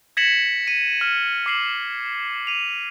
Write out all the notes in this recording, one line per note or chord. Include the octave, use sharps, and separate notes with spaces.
G#6 A#6 B6 C#7 E7 F#7
D#7
F6 D#7
D6 C7 F#7
D#7 F7